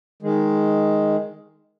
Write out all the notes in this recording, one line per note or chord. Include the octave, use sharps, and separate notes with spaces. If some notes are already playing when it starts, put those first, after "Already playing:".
D#3 G#3